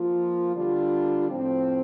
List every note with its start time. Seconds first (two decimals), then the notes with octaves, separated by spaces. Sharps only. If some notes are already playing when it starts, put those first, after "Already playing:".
Already playing: F3 A#3 F4
0.55 D3 G3 D4 F4
1.30 A2 F3 C4